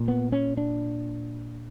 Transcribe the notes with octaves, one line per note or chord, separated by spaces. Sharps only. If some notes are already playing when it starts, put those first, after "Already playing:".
Already playing: A#2
B3
C#4
D4